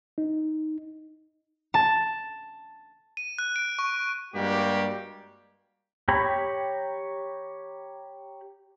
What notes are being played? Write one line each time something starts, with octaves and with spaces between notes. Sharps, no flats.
D#4
A5
D#7
F#6
D7
C#6
G2 G3 G#3 A#3 F#4 G4
G4 C#5 A#5 B5